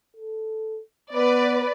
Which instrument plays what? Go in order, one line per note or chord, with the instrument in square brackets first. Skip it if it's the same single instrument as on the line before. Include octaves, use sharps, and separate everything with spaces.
[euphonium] A4
[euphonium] B3 [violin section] B4 D5